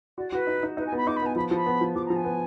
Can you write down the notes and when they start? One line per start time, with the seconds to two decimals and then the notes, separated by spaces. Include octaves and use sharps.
0.18 F#4 D5
0.33 F#4 B4
0.47 D#4
0.63 D#4
0.77 D#4 B4
0.86 G#5
0.92 B3 B5
1.07 D#4 D6
1.16 B5
1.22 B3 G#5
1.36 F3 B5
1.51 F3 B5
1.66 B3
1.81 F3
1.95 F3 D6
2.06 A#5
2.10 F3
2.15 G#5
2.25 B3